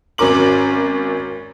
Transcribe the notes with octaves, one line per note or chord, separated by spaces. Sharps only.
G#1 F#3 C#4 A#4 D6 F#7